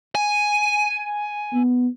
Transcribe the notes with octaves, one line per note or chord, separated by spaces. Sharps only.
G#5
B3